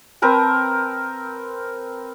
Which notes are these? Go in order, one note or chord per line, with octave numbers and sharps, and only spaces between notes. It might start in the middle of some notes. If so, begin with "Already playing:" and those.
C4 A#4 B4 A5